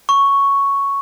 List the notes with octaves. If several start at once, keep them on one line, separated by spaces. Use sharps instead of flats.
C#6